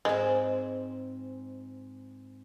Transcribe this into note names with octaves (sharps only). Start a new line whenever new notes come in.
G#2 G#3 C4